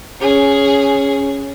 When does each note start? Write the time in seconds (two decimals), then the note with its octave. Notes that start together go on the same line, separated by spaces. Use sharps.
0.20 C#4 G#4